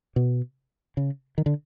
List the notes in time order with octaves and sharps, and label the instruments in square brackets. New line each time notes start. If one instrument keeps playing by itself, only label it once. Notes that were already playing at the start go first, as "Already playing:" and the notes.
[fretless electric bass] B2
C#3
D#3
D3